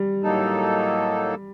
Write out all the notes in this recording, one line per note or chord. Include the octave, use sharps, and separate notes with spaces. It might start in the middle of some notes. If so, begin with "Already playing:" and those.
Already playing: G3
A2 F#3 A#3 D#4 A4